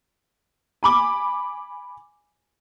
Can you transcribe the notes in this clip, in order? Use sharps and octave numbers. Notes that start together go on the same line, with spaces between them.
G#5 B5 D6